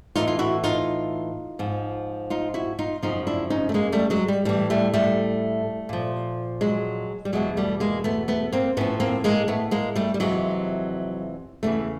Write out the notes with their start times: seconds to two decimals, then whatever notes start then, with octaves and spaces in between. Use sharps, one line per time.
0.16 A2 E3 D#4 F4
0.28 F4
0.39 E4 F#4
0.64 D#4 F4
1.59 G#2 F3
2.30 D#4 F4
2.54 E4 F#4
2.79 D#4 F4
3.02 F#2 C#3 F3 D#4 F4
3.27 D4 E4
3.50 C#4 D#4
3.69 A3
3.74 G#3 A#3
3.92 G3 A3
4.10 F#3 G#3
4.28 G3
4.45 A2 E3 G3
4.70 G3 A3
4.94 G3 A3
5.89 A#2 F3
6.61 F#3 G#3
7.25 G3
7.33 E2 B2 F#3 G#3
7.57 G3 A3
7.80 G#3 A#3
8.04 A3 B3
8.28 A3 B3
8.53 A#3 C4
8.77 A2 F3 B3 C#4
9.00 A#3 C4
9.24 G#3 A#3
9.48 A3 B3
9.71 G#3 A#3
9.96 G3 A3
10.14 G3
10.20 F2 C3 E3 F#3 G#3
11.63 E2 C#3 E3 G3 A3